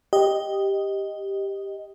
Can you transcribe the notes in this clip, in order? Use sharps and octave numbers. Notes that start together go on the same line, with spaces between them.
G4 D#5